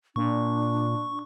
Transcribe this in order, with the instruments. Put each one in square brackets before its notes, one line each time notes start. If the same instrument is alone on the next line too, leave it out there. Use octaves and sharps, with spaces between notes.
[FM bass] A#2 [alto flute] D4 [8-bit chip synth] C#6